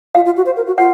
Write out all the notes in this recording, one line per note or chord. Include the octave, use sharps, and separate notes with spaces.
F4 F5
F4
F#4
C5
A#4
F#4
F4 F#5